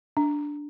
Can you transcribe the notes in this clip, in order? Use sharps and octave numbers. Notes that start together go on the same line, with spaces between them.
D4